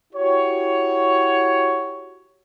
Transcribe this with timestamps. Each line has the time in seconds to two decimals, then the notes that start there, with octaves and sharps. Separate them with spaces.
0.13 E4 F#4 G4 C#5